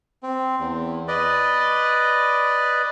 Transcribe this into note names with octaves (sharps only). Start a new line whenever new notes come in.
C4
E2
B4 D5 D#5